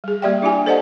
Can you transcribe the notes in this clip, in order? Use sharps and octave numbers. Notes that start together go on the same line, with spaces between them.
G3 G#4
G3 A#3 G4 D5 E5 G5
D4 E4 F4 G4 G#5
A4 C5 D5 D#5 F#5 A5